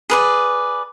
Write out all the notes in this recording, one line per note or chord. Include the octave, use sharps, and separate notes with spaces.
G#4 B4 D5